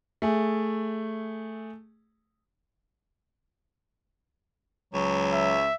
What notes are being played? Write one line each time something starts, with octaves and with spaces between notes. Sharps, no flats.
A3 G#4
C#2 F#3
E5